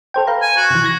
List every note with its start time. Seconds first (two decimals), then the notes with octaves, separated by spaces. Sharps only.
0.14 A4 C5 G5
0.27 B4 F5 A#5
0.42 G#5
0.57 F#4
0.71 C3 E3
0.84 G#6 A#6